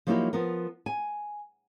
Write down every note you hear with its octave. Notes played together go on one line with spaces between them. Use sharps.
F3 F#3 A#3 D#4 E4 G4
F3 B3 A#4
G#5